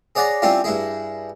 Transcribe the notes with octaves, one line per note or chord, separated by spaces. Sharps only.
G#4 C#5 D5 F#5 G#5 A#5
G3 C4 C#4 E4 F4 G4
G2 E4 G#4